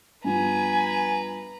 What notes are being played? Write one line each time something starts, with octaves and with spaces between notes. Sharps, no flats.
G2 F3 B3 B4 G#5 A#5